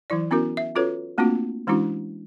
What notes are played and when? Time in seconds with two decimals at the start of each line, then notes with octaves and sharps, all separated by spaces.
0.10 E3 F#3 E4 D5
0.31 B3 C#4 E4 F#4 A#4
0.57 E5
0.75 C#4 F4 F#4 A4 B4 C#5
1.18 A3 A#3 C4 D4 F4 F#4
1.67 E3 G#3 C#4 D4 E4 F#4